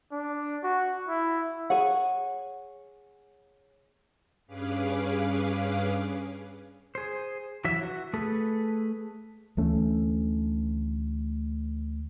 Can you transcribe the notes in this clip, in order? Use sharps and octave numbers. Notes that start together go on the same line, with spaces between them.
D4
F#4
E4
G#4 C#5 F#5
G2 C#4 G#4 B4 F5 D6
G#4 C5
E3 F#3 E5
F#4
A3 G#4 A4 B4
D2 E3 A3 C#4